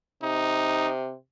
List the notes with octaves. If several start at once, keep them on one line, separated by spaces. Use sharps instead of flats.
C3 D#4